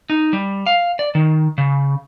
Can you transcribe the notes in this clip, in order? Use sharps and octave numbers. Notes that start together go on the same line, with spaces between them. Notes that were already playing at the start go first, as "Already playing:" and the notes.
D#4
G3
F5
D5
D#3
C#3